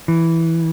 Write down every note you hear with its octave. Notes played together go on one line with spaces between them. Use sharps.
E3